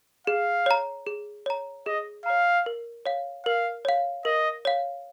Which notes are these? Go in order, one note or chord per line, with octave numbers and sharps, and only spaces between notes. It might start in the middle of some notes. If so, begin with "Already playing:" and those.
G#4 F5
C#5 A#5
G#4
C#5 A#5
G#4 D#5
C#5 F5 A#5
A#4
C#5 F5
A#4 F5
C#5 F5
A#4 D#5
C#5 F5